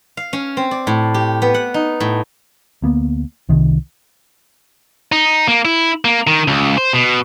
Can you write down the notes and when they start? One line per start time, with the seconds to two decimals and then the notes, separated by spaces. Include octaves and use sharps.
0.17 F5
0.33 C#4
0.57 C4
0.71 D5
0.87 A2
1.14 G4
1.42 B3
1.54 F#5
1.74 D#4
2.00 A2
2.82 D2 A#3 B3
3.49 C2 C3 D#3
5.12 D#4
5.48 A#3
5.65 E4
6.05 A#3
6.27 D#3
6.48 C#2
6.77 C5
6.93 B2